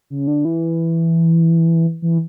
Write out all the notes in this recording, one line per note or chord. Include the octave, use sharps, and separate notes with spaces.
C#3
D3
E3
E3